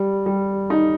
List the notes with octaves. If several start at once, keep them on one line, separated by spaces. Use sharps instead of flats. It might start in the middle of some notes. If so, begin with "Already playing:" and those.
Already playing: G3
G3
D#4